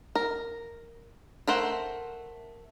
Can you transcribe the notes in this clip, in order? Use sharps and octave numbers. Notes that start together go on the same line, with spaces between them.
A#4
A3 A#4 C5 F#5